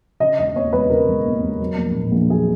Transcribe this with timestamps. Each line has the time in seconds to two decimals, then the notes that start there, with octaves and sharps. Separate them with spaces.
0.20 C#3 D#5
0.39 E1 D#5
0.56 D#2 C#5
0.73 E1 B4
0.90 C#3 A#4
1.08 E1
1.26 D#2
1.43 E1
1.60 F#3
1.78 A#1
1.95 A#2
2.12 A#1
2.29 F#3 G#4